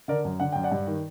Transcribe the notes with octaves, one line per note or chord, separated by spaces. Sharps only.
D3 A#4 D5
F#2
D3 F#5
F#2 G5
D5 F#5
G2
D#3